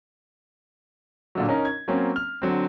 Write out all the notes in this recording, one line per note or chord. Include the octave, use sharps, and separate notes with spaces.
A#2 D3 F#3
C#4 D#4 A#4
G#6
F#3 A#3 C4 C#4
F6
D3 F#3 C4